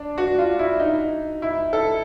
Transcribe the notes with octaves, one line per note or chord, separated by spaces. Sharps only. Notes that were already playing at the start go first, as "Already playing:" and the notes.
Already playing: D4
F#4
F4
E4
D#4
E4
A4